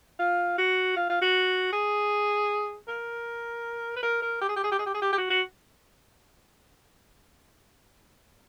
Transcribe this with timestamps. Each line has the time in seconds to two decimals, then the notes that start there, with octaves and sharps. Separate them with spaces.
0.19 F4
0.58 F#4
0.96 F4
1.09 F4
1.22 F#4
1.72 G#4
2.88 A#4
3.96 B4
4.03 A#4
4.22 A#4
4.41 G4
4.49 G#4
4.56 G4
4.64 G#4
4.72 G4
4.79 G#4
4.86 G4
4.94 G#4
5.02 G4
5.12 G4
5.18 F#4
5.30 F#4